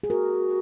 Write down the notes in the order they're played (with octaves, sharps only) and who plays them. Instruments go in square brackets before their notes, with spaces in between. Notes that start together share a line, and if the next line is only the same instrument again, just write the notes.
[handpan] G#4
[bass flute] F#4 [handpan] A#4